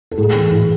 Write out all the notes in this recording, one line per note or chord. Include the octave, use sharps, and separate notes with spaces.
A4
A2 G#4
E3
A2